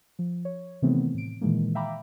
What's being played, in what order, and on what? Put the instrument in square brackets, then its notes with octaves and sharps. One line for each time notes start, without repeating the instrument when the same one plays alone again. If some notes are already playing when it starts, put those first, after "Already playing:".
[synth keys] F3
C#5
C3 D#3 E3 A3 B3 C4
A2 D7
A#2 D#3 E3 G#3 A#3
E5 F5 G5 A#5 B5 D6